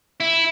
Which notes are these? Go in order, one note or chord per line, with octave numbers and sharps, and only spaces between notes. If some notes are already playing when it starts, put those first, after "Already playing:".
E4